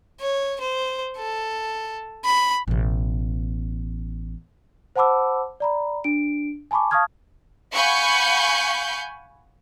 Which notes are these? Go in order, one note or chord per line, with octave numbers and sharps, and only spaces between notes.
C#5
C5
A4
B5
A1 B2
C5 F#5 A5 B5 D6 E6
D5 A#5 B5
D4 D7
G#5 A5 B5 C#6 D6
F5 A5 C#6 D#6 F6 G#6
F5 F#5 G#5 B5 C#6 G6